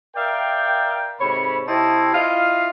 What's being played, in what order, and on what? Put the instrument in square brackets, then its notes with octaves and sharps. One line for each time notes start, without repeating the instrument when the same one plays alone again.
[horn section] A#4 D5 E5 F5 G5
G#2 C3 A4 C#5 B5
C3 C4 E4 G4 D#5 A5
E4 F4 D#5 F5